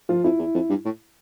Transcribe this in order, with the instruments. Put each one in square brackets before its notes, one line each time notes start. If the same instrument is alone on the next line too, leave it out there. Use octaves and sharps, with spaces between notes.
[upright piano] F3 F4
[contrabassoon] F2 [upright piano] E4
[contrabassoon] E2
F2
G2
A2